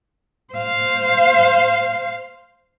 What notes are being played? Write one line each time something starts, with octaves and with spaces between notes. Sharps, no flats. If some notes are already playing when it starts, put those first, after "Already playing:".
C5 F5